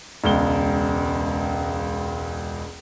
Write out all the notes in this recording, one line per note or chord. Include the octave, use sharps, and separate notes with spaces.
E1 C#2 G7